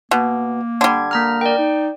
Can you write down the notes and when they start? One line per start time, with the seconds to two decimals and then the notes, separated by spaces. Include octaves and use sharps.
0.11 B2 A#3
0.81 D3 G3 G#6
1.11 A#3 A#5 F6
1.41 A#4 D5 G5
1.58 D#4